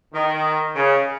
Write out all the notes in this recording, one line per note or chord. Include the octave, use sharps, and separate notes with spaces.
D#3
C#3